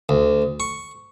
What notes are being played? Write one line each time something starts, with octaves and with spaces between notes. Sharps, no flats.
D2
C#6